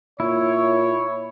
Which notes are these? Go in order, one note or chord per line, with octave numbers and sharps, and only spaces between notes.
A#2 E4 C#5